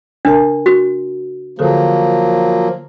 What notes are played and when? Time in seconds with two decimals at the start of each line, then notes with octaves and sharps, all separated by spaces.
0.25 C#3 D4 A#4 A5
0.66 F#4
1.59 D3 F3 F#3 A#3 G#4 A4